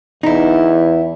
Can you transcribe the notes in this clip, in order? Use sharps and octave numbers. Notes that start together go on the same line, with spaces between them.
E2 D#4 E4